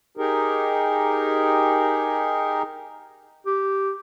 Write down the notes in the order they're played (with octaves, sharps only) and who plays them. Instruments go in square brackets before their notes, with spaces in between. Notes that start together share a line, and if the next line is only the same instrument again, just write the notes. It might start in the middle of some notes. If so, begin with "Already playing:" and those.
[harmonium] D#4 G4 G#4 A#4
[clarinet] G4